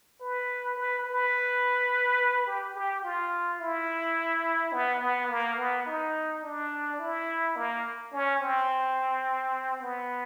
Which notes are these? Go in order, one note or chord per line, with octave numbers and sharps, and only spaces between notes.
B4
B4
B4
G4
G4
F4
E4
B3
B3
A#3
B3
D#4
D4
E4
A#3
C#4
C4
B3